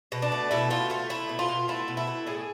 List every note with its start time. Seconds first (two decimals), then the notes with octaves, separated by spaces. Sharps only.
0.12 B2
0.22 D4
0.32 A3
0.51 B2 E4
0.70 A3 F4
0.90 A3 F4
1.10 A3 E4
1.29 B2
1.39 F4
1.48 B2
1.68 A3 E4
1.88 B2
1.97 E4
2.07 A3
2.27 A2 G#4